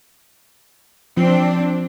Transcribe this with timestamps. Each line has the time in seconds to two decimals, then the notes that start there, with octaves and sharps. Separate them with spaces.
1.17 F3 C4 D4